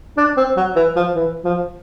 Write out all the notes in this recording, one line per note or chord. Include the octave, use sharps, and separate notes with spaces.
D4
C4
F#3
E3
F3
E3
F3